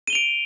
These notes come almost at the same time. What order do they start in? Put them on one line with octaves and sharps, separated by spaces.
D#7 G7 F7 D7